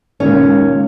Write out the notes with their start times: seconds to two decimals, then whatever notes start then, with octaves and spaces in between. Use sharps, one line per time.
0.20 C#2 A#2 D#3 C#4 C#5